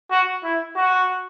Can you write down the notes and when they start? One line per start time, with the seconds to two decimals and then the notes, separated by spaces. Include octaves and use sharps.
0.11 F#4
0.44 E4
0.76 F#4